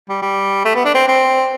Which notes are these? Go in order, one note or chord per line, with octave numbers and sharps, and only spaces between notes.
G3
G3
A3
B3
D4
C4
C4